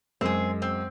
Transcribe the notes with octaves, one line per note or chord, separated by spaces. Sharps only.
F#2 G#3 C4 G#4
C4